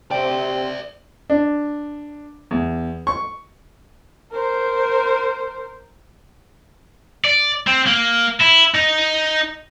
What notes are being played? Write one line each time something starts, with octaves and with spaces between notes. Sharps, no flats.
C3 D5 E5 G5
D4
E2
C#6
A#4 C5
D5
C4
A#3
E4
D#4